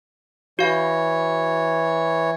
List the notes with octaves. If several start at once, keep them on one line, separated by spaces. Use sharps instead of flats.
E3 F#4 C#5 F5